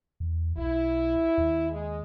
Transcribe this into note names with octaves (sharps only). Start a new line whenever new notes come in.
E2
B1 E4
D#2
G#3